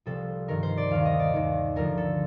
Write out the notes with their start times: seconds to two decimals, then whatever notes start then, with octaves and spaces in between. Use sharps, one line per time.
0.06 C2 C3 F3 A4
0.48 G2 D#3 A#4
0.63 C5
0.77 D5
0.91 D#2 D#3 F5
1.05 D#5
1.19 D5
1.34 D#2 D#3
1.76 D2 D3 F3 A#4
1.97 A4